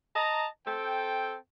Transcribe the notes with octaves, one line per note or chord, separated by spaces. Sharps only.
D#5 A5 A#5
C4 A4 G5